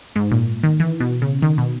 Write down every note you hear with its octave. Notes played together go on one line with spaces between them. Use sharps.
G#2
A#2
D#3
E3
B2
C#3
D#3
B2